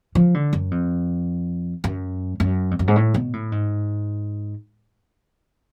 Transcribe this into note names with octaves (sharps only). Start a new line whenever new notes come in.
F3
D3
F#2
F2
F#2
F#2
F2
F#2
G#2
A2
B2
A2
G#2